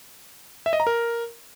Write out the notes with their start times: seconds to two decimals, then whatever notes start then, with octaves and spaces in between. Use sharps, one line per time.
0.66 E5
0.73 D#5
0.80 A#5
0.87 A#4